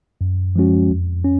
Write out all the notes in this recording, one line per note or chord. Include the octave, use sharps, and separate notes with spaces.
F#2
F3 G#3 C#4 F#4
F2
C#4